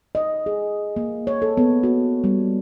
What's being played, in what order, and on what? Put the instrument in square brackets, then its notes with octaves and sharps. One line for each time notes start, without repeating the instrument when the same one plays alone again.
[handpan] D#5
G#4
A#3
C#5
A4
B3
F#4
G3